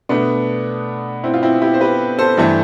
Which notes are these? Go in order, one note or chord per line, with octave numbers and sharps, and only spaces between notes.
B2 A3 B3 D4
C4 E4
F4
C4 E4
E4 G4
C5
G4 B4
A4 C5
G2 E3 A3